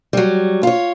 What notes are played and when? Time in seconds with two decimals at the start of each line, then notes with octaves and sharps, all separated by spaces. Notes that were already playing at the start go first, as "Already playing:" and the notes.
0.13 F#3 G3
0.63 F4 C#5